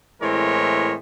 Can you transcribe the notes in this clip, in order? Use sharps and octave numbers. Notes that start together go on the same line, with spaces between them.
A2 E3 G#3 C4 A#4 C#5